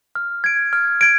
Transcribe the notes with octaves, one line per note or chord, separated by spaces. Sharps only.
F6
G#6 D7
F6
G#6 D7